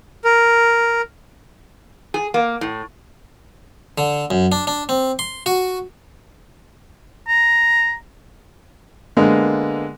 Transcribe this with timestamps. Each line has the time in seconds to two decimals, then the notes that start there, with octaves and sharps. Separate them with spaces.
0.24 A#4
2.14 G#4
2.34 A#3
2.61 A2
3.98 D3
4.31 F#2
4.52 D4
4.67 D4
4.89 C4
5.19 C6
5.46 F#4
7.28 A#5
9.17 D3 G#3 A#3 B3